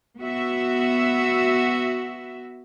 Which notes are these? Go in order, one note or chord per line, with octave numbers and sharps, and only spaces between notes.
B3 F#4 E5